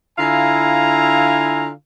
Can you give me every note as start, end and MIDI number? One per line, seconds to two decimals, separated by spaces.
0.18 1.70 50
0.18 1.70 64
0.18 1.70 65
0.18 1.70 77
0.18 1.70 80
0.18 1.70 82